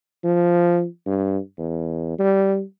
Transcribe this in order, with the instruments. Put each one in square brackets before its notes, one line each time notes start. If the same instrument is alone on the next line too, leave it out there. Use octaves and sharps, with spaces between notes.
[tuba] F3
G2
E2
G3